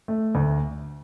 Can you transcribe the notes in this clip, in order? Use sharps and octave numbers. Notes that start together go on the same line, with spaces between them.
A3
D2